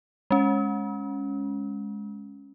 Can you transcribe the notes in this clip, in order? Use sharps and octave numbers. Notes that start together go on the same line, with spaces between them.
G#3 C#4